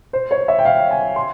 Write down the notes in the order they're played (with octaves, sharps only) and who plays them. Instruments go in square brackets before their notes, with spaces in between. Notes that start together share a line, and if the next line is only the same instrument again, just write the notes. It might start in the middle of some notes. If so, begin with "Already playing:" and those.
[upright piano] C5
C#5
E5
G5
F5
G#5
C6